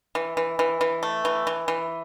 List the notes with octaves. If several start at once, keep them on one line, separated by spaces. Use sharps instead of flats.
E3
E3
E3
E3
A3
E3
E3
E3